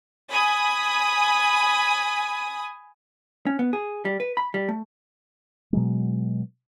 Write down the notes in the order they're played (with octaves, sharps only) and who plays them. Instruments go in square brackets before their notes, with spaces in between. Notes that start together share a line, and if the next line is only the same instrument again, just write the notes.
[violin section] G#5 B5 D#6
[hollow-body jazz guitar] C#4
B3
G#4
G3
B4
B5
G3
A3
[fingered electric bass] B2 F#3 G#3